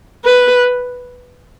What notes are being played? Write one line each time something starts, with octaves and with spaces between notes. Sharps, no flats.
B4